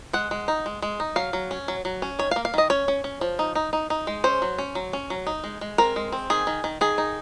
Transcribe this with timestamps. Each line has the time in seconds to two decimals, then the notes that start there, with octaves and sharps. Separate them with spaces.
0.13 G#3 F#5
0.31 G#3
0.48 D#4
0.66 G#3
0.82 G#3
1.00 D#4
1.16 F#3 F5
1.33 F#3
1.51 C#4
1.68 F#3
1.85 F#3
2.02 C#4
2.19 D#3 C#5
2.31 F5
2.36 A#3
2.45 F5
2.54 D#3 D#5
2.70 C#4 C#5
2.88 C#4
3.04 C#4
3.21 F3
3.39 D#4
3.55 D#4
3.73 D#4
3.90 D#4
4.07 G#3
4.24 C#4 C5
4.42 F#3
4.58 C#4
4.75 F#3
4.93 C#4
5.10 F#3
5.27 D#4
5.44 G#3
5.61 G#3
5.78 C4 A#4
5.96 G#3
6.12 C4
6.30 D#3 G#4
6.47 D#3
6.64 D#3
6.81 D#3 G#4
6.98 D#4